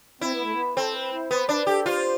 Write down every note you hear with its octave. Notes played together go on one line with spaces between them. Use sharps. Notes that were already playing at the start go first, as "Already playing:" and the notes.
C4 E4
B3
A3
B3
C4 A4
B4
E4
B3 C5
D4 B4
G4 A4
F4 C5